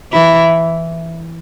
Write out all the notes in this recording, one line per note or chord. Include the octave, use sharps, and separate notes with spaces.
E3 E4